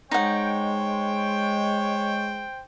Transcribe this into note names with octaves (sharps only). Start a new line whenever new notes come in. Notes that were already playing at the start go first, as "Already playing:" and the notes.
G#3 D#4 C5 C#5 F#5 G5